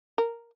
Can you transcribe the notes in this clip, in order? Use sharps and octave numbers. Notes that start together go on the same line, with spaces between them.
A#4